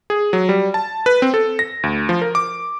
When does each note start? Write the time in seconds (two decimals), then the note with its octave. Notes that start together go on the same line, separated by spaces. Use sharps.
0.10 G#4
0.33 F#3
0.49 G3
0.74 A5
1.06 B4
1.22 C4
1.34 A4
1.59 A#6
1.83 D2
2.09 F3
2.21 A#4
2.35 D6